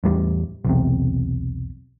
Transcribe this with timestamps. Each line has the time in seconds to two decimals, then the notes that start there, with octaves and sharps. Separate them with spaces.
0.04 A1 E2 G3
0.65 B1 E2 C3